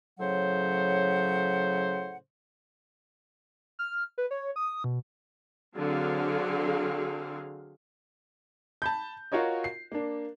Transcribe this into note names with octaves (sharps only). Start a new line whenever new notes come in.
A2 C#3 F#3 C5 F#5
F6
B4
C#5
D#6
B2
D3 F#3 C4 G#4 F5
A5 B5 G6
F4 F#4 A#4 C#5 D#5
C7
A#3 D4